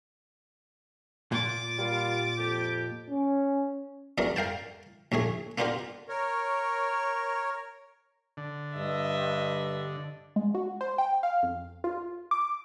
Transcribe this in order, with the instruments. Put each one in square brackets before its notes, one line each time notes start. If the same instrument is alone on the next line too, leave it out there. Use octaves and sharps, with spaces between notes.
[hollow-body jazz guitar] A#2 [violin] D6 A6
[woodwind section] G3 A#3 F4
F2 G4
[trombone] C#4
[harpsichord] E2 E3 F#3 D4 A#4
A#4 F5 G5 A5
A#1 D#2 A3 G#4
A#3 B3 D4 F4 G4 A#4
[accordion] A#4 C#5
[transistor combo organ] D3
[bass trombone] G2 [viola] D#5 E5
[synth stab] G#3
F#4
C5
G5
F5
F2
F4
D6